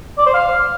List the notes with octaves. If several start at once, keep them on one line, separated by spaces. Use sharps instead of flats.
D5
C5
F5